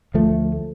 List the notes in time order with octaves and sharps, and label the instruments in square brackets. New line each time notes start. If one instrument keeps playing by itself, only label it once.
[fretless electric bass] D2 F3 A3